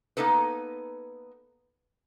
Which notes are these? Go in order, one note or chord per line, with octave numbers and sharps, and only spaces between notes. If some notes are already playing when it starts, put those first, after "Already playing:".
A#3 B3 D#4 A4 B4